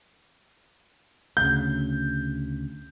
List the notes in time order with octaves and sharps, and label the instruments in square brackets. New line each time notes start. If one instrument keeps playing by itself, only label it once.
[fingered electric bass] D2 C#3 [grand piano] G6